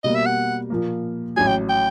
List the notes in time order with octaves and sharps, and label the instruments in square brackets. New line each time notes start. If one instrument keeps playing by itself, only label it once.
[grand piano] B2 G3 A#3 [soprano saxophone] D#5
[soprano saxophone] E5
F#5
[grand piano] A#2 F3 A#3
[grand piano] A1 A2 F#3 [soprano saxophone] G#5
[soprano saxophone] G5
G5